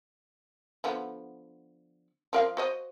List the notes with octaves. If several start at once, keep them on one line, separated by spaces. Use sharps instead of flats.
D3 F3 B3
F3 A#4 F5
F#4 C5 D#5